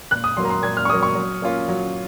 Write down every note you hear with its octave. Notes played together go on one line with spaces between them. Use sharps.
A#2 F#6
D#6
F#3 A#3 C6
A#5
C6
A#2 G#6
F6
C#6
F#3 A#3 D#6
C#6
F#3
A#3 C#4 F4
F#3